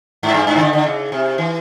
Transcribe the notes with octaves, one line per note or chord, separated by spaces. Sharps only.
G#2
G2
G#2
D#3
D3
D3
C#3
C3
E3